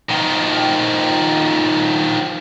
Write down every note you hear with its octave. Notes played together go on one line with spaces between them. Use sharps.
D#3 F3